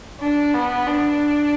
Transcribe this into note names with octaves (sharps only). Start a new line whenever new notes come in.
D4
B3
D4